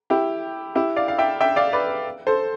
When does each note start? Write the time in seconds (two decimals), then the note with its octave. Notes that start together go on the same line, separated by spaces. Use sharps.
0.10 E4 G4
0.75 E4 G4
0.96 D5 F5
1.08 F5
1.19 E5 G5
1.41 E5 G5
1.56 D5 F5
1.73 B4 D5
2.27 A4 C5